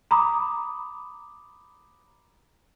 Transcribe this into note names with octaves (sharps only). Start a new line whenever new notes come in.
A#5 B5 D6 D#6